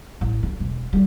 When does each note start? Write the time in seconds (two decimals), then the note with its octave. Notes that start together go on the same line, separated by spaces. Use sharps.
0.21 A1
0.43 D3
0.60 E1
0.93 E3 G3